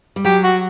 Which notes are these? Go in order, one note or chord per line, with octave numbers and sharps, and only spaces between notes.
G3
F#3 G4
F#4